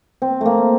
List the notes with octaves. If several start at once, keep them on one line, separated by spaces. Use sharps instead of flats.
C4
A3 A#3